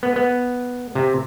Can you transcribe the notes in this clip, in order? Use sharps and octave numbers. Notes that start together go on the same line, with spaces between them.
B3
B3
C3